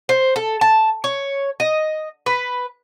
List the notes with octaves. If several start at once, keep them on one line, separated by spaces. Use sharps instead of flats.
C5
A4
A5
C#5
D#5
B4